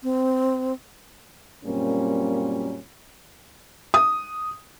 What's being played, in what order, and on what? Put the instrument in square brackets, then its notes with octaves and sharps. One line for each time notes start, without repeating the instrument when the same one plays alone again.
[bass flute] C4
[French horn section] F#2 A#2 G3 A#3 C4 C#4
[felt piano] D#6